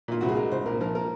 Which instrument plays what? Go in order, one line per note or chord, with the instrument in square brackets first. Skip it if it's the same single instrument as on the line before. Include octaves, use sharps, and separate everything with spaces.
[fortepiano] A#2 F4
C2 F#4
G#4
G#3 A#4
C2 C5
A#2 A#4
F3 A#4
A#3 A#4